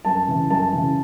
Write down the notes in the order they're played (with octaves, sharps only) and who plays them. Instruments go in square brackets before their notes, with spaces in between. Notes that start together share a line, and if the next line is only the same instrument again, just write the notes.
[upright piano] F#2 A5
C#3 E3
F#2 A5
C#3 E3